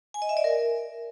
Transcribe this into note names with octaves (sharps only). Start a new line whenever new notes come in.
G#5
D#5
E5
D5
A#4